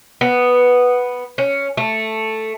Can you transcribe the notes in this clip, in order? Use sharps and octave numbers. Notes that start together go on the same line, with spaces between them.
B3
C#4
A3